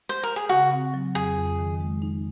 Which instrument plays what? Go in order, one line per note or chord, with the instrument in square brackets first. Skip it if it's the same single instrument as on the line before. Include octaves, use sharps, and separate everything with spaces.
[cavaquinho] C5
A#4
G#4
[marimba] C#3 [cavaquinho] F#4
[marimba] C4
F#3
[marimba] F2 [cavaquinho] G#4
[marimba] F2
D#3
G#3
D#4